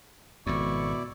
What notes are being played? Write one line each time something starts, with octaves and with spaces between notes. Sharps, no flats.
G#1 F2 B2 E4 D5 C#6